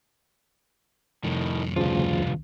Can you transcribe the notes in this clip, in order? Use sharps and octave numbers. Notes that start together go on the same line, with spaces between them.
C2 F2 A2 D#3
D2 G2 C#3 F3 F4